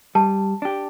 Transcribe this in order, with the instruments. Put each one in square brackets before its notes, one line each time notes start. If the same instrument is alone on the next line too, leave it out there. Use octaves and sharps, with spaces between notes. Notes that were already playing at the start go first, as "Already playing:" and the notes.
[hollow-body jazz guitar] G3 [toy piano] A5
[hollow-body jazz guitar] D4 G4